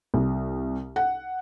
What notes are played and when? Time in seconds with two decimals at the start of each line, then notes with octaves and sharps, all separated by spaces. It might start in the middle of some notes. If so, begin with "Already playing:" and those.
0.14 C2
0.96 F#5